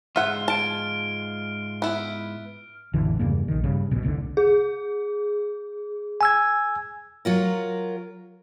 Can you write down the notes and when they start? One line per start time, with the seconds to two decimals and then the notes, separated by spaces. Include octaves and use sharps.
0.16 G#2 G#3 F4 E5 F#5 F6
0.48 A5 F6 D7
1.82 B3 E4
2.93 A1 F2 D3 E3
3.19 E2 G2 C#3 A#3
3.48 A#1 D#3
3.64 G2 C#3
3.91 D#1 A#1 B2
4.03 F1 C2 A#2 D3
4.37 G#4
6.21 G#5 E6 G#6
7.25 F#3 F4 A#4